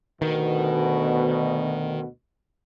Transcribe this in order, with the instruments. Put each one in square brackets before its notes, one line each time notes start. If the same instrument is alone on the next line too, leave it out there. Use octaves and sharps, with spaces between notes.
[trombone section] D2 B2 [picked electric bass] D#3